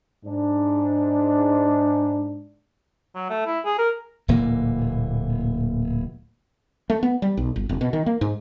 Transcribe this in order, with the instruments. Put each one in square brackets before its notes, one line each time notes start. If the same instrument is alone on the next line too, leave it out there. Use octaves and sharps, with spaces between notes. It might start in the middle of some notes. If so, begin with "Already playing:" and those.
[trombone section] G#2 D4
[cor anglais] F#3
A3
E4
G#4
A#4
[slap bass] D1 A#2 E3 A#3
[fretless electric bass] A3
B3
G3
B1
G1
F1
B2
D#3
A#3
G#2